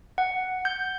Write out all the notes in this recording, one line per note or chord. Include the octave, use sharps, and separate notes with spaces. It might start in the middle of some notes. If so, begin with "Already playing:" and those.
F#5
G6